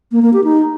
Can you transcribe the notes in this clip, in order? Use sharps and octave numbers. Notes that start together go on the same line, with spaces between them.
A#3
A#3
G4
D#4